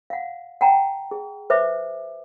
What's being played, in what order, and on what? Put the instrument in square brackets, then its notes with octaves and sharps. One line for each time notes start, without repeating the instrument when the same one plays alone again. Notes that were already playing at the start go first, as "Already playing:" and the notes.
[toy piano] F5 F#5
F#5 G5 A5 A#5
G#4
B4 C5 E5 D6